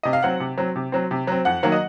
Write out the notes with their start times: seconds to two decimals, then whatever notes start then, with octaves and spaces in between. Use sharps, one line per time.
0.03 C3 D#5
0.13 F5
0.23 F#3 C4 F#5
0.40 C3
0.58 F#3 C4
0.76 C3
0.92 F#3 C4
1.11 C3
1.27 F#3 C4
1.45 F2 F#5
1.63 D#3 F#3 A#3
1.72 D#5